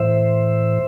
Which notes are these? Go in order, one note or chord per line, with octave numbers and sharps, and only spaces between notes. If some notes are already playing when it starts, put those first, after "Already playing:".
Already playing: A2 E3 C5 E5